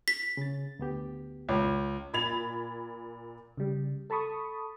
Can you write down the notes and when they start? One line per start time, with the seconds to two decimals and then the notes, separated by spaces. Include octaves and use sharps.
0.08 B6
0.37 C#3 A6
0.79 D2 B3 G4
1.49 C#2
2.13 A#2 B5 G#6 A6 F7
3.57 C#3 G3
4.10 A4 A5 B5 C#6 D#6